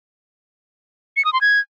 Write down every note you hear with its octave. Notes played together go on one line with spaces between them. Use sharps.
C#7
D#6
C6
G#6